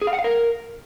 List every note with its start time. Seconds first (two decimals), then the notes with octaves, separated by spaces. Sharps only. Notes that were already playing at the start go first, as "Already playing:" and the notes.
0.02 G#4
0.07 F5
0.13 F#5
0.19 F5
0.24 A#4